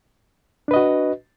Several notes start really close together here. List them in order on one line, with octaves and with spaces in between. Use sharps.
D4 B4 D#5 F#4